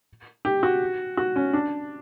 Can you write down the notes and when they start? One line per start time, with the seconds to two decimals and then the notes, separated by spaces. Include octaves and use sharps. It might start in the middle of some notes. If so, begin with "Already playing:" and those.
0.45 G4
0.63 F#4
1.17 F#4
1.36 C#4
1.53 D4